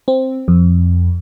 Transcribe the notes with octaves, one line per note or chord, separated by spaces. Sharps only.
C4
F2